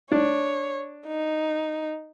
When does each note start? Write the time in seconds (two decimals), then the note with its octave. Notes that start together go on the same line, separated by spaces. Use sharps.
0.12 D4 C#5
1.07 D#4